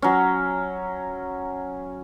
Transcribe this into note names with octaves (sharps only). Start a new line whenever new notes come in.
F#3 C#4